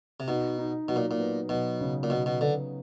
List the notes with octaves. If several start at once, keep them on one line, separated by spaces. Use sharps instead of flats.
C3
B2 D#4
D#4
B2 F#3
A#2
A#2
B3
B2 F#3
C#3
A#2
B2 B3
B2
D3 B3